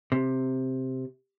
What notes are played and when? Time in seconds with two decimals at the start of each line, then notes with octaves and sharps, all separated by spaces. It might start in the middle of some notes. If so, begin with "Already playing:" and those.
0.12 C3